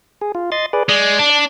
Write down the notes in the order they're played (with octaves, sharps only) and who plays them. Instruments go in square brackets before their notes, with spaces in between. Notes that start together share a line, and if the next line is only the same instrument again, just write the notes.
[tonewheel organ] G#4
F4
D#5 C6 A6
G#4 B4 D5
[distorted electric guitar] G#3 [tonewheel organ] D5
[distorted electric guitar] D4